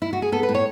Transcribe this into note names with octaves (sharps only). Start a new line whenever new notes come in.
E4
F#4
G#4
B3 A4
B4
A2
C#5